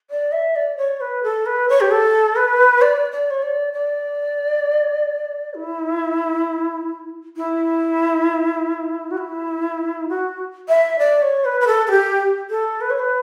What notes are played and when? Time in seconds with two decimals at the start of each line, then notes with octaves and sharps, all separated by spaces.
0.10 D5
0.32 E5
0.56 D5
0.77 C#5
1.01 B4
1.23 A4
1.46 B4
1.69 C#5
1.80 G4
1.91 A4
2.36 B4
2.82 D5
3.12 D5
3.31 C#5
3.42 D5
3.73 D5
5.54 E4
7.37 E4
9.11 F#4
9.17 E4
10.09 F#4
10.68 E5
10.99 D5
11.22 C#5
11.45 B4
11.60 B4
11.67 A4
11.87 A4
11.91 G4
12.50 A4
12.81 B4
12.90 C#5
12.99 B4